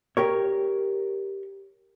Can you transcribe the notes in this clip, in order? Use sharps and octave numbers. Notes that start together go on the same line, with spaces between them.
G4 A#4 C#5